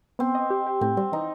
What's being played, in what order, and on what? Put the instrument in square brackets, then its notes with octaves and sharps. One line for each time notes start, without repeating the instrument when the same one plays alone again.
[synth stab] B3 [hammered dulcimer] C4
[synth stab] D#5
G4
G4
[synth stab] A2 [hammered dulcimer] C4
[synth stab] G3 [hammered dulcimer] C4
[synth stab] E3 [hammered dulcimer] D#4